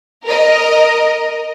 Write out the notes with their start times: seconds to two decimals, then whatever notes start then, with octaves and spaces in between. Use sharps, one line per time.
0.25 A#4 D#5